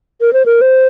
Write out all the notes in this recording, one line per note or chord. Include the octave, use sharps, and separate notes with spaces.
A#4
C5
A#4
C5